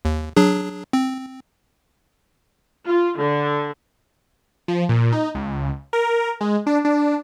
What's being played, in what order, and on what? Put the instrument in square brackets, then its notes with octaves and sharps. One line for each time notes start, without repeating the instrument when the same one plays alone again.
[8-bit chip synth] D#2
F#3 D4 G#4
C4
[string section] F4
D3
[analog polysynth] F3
A#2
D#4
C#2
A#4
G#3
D4
D4